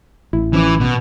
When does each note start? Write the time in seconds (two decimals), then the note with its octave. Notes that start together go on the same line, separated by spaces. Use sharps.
0.33 A1 E4
0.53 E3 F3 C#4 D6
0.80 B2